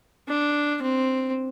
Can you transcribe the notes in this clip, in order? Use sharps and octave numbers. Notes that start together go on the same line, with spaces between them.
D4
C4